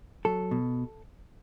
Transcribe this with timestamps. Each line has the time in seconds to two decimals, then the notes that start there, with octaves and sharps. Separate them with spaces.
0.25 F#3 A4
0.51 B2